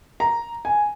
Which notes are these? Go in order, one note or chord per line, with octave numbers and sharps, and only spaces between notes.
A#5
G#5